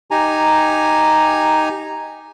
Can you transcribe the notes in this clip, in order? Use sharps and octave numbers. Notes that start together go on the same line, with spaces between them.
D#4 G4 G#5 A#5